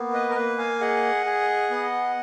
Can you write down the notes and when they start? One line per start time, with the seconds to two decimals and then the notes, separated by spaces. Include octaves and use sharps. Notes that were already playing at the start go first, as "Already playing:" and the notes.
Already playing: A#3 B3
0.13 B4 D#5
0.30 A#4
0.35 A#3 B4
0.58 F5 G#5
0.81 G#4 D#5 F#5
1.26 G#4
1.70 B3